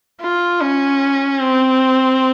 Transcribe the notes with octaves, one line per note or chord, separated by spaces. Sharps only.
F4
C#4
C4